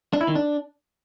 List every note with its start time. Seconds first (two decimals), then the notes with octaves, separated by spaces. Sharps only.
0.13 D4
0.21 E4
0.28 D#3
0.35 D4